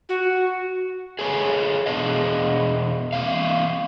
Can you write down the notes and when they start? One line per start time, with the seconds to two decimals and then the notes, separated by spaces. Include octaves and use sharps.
0.09 F#4
1.19 G#4 A4 B4 C#5 G#5
1.86 E2 B2 D4 G#4 D#5 F5
3.13 E3 A#3 C4 E5 F5